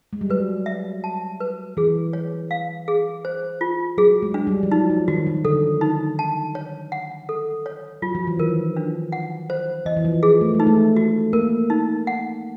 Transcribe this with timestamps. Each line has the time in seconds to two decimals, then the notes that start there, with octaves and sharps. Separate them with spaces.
0.13 G#3
0.21 G3
0.30 F#3 B4
0.66 E5
1.04 A5
1.40 B4
1.77 E3 G#4
2.13 C#5
2.51 F5
2.88 G#4
3.25 C5
3.61 F4
3.98 F#3 G#4
4.22 G#3
4.34 D4
4.47 G3
4.63 F3
4.71 F#3 D#4
4.90 F3
5.08 D#3 F#4
5.27 D#3
5.45 D3 A4
5.81 D#4
6.19 A5
6.55 C#5
6.92 F#5
7.29 A4
7.66 C#5
8.02 F#3 F4
8.15 F3
8.27 E3
8.39 D#3 A#4
8.76 D4
9.12 F#5
9.50 C5
9.86 E3 D#5
9.97 E3
10.05 F3
10.23 F3 G#4
10.41 A3
10.54 G#3
10.60 D#4
10.67 A3
10.96 F#4
11.33 A#3 A#4
11.70 D#4
12.07 F#5